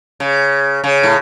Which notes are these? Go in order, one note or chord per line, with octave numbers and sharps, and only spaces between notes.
C#3
C#3
A2